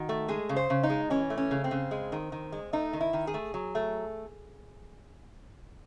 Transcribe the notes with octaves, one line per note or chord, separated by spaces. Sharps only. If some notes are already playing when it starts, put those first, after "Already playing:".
Already playing: D#3 F#4
A3
G#3 G#4
C#3
C5
C#3
D#4
G#3
E3 C#4
A3
C#4
C#3
C4
C#3
G#3
D#3
D#3
G#3
A3 D#4
D#3
E4
D#3
G#4
A3
F#3
A3